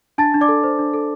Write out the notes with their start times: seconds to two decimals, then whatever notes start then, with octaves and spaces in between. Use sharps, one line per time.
0.18 D4 A5 A6
0.34 D4
0.41 D5 D6
0.48 A4
0.63 C5
0.79 D4
0.94 A4